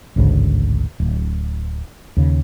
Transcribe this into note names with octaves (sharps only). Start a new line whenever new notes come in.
A1 D2 G#2 C#3
D1
D#2 C#3